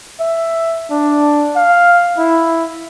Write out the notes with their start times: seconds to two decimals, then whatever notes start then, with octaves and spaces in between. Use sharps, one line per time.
0.20 E5
0.90 D4
1.56 F5
2.18 E4